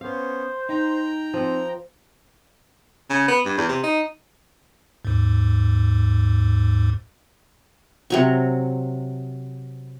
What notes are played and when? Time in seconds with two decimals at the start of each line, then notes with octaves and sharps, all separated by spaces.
0.01 B3 C#4 C5 F5
0.69 D#4 G5 A#5
1.34 F3 C4
3.10 C#3
3.28 B3
3.45 G2
3.57 E2
3.69 C3
3.83 D#4
5.05 D#2 G#2
8.10 C3 F#3 C#6